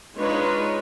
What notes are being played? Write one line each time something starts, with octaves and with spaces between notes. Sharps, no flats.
G#3 D4 D#4 F4 B4 C#5